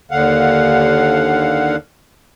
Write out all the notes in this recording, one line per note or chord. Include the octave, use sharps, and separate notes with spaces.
D#2 D3 F5 F#5